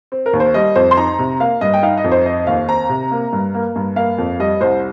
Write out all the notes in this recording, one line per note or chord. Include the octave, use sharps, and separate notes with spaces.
C4
A#4
D#2
C5
G3 D#5
F2 C5
C6
D#4 A#5
C3
A#3 F5
G2 D#5
G5
D#4 F5
D#5
F2
C5
C4 D#5
D#2 F5
C4 A#5
C3
A#3
G2
A#3
G2
A#3 F5
F2
G3 D#5
C2 C5